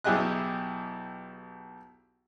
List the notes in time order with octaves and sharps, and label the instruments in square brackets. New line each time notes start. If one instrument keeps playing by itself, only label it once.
[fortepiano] B1 E4 G4 G#4 D#5 F#6